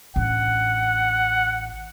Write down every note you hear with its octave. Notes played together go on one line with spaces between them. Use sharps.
A1 D4 F#5